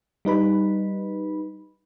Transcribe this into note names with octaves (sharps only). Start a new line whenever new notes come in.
G3 D#4 B4 B5